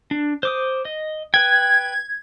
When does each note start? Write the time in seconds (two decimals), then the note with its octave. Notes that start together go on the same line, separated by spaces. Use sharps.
0.11 D4
0.43 C5 D6 D#6
0.85 D#5
1.34 B4 G5 G#6